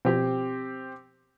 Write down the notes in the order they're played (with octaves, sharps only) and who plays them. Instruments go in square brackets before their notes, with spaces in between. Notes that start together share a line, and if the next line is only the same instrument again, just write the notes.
[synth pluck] B2 F3 [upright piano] C4 G4